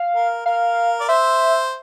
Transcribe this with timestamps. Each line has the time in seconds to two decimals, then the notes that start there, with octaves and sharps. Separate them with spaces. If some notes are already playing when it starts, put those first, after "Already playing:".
Already playing: F5
0.15 A#4
0.46 A#4 F5
1.00 D5
1.08 C5 E5